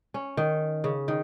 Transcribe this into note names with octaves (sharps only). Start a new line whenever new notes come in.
C#4
D#3
C#3
D#3